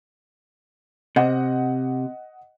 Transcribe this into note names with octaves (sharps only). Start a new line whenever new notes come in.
C3 D#5 F#5